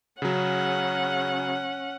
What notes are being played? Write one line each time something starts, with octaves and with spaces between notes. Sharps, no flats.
C#3 F#3 C#4 F#5